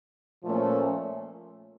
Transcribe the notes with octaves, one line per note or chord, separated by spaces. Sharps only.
A#2 F3 A3 C#4